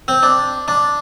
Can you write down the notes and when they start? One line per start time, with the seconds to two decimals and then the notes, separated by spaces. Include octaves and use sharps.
0.08 C4
0.23 D4
0.68 D4